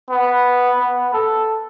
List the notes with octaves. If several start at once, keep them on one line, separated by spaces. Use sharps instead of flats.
B3
B3
A4